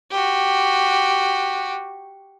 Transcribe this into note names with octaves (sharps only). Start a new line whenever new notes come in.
F#4 G4